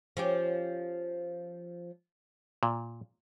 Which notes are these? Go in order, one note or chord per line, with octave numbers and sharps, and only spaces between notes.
F3 C#4 G4
A#2